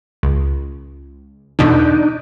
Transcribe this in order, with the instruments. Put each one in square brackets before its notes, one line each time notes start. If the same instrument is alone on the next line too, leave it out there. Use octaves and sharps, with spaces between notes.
[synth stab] C#2
[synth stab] E2 B2 D3 [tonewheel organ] D4 D#4